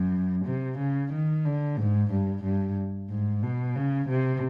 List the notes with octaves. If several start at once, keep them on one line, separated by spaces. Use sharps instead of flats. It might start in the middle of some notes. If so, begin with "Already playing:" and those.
Already playing: F#2
C3
C#3
D#3
D3
G#2
G2
G2
G#2
B2
C#3
C3